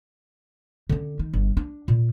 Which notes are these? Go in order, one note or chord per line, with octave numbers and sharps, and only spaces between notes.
D3 C#4
D#3
G1
D4
A#2